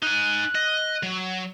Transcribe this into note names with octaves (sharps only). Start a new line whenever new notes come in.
D#4 G#5 F#6
D#5
F#3